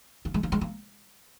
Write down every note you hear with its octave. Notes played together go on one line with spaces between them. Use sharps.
A#3
G#3
A#3
G#3
A#3